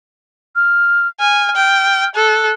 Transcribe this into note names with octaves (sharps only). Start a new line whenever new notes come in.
F6
G#5 F6
G5
A4 F#6